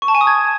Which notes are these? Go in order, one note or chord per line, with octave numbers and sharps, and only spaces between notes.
C#6
A5
G#5
D#6
G#6